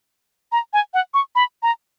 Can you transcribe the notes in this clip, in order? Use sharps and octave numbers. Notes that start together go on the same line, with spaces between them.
A#5
G#5
F#5
C#6
B5
A#5